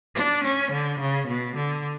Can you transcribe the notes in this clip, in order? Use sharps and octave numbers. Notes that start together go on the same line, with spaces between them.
D4
C#4
D3
C#3
B2
D3